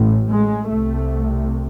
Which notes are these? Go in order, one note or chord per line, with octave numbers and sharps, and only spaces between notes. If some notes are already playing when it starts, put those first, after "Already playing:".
Already playing: A1 A2
G#3
C2 C3 A3